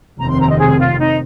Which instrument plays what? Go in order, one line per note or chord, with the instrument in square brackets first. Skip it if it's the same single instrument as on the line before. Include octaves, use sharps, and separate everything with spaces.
[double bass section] F1 D#2 D#3 C4 [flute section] A#5
[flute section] C6
A#5
D#5
G#4
F4
D#4